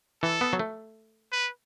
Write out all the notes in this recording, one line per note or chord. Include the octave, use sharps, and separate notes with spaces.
E3 A4
B3
F#3
A3
B4